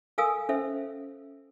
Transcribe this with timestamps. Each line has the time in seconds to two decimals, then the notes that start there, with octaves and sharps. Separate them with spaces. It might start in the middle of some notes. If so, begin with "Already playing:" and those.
0.18 A4 A#4 F5 G#5 D#6 E6
0.49 C#4 A4 C5 E5